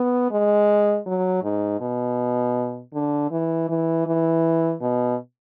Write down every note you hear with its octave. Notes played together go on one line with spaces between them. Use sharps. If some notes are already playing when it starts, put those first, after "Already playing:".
Already playing: B3
G#3
F#3
G#2
B2
D3
E3
E3
E3
B2